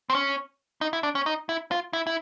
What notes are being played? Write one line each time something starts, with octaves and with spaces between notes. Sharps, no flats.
C4
C#4
D#4
E4
D4
C#4
D#4
E4
F4
E4
E4